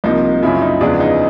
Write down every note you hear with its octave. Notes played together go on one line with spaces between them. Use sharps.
C2 C3 F3 A#3 D#4
F#2 C#3 F3 E4
D#4
E2 C#3 F3 G#3 B3 D4
D#4